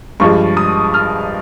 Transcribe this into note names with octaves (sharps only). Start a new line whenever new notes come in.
G2 F3 G#3 C#6
D#6
F6